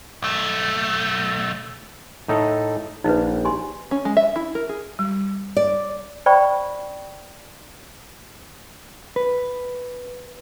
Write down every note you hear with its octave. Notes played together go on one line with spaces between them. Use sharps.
B1 A3
A2 D#4 A4
A#1 D#4 B4
G4 G#5 C6
C#4
G#3
E5
E4
A#4
G#4
G3
D5
C5 D5 G5 B5 C#6
B4